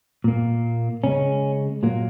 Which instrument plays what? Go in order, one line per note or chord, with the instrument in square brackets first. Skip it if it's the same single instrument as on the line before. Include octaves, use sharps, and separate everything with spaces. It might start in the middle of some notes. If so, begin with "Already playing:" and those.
[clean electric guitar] A#2 A#3
C#3 G#3 C#4
A#2 F#3 A#3